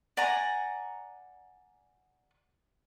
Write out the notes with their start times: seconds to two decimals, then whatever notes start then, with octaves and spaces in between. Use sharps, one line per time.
0.17 D5 F#5 G#5 A#5